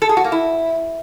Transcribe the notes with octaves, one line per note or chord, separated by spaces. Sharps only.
A4
G#4
F#4
A#3
E4